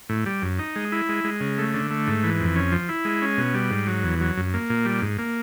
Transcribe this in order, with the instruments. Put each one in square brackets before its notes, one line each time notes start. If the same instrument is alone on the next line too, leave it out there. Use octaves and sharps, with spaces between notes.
[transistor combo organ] A2
G3
F#2
D#4
G#3
E4
G#3
G#3
C#3
A3
D3
A3
G#2
E3
F2
C#4
F3
E4
G#3
C#4
B2
G3
G#2
F#3
E2
F#3
F#2
A#3
A#2
G3
G#2
A#3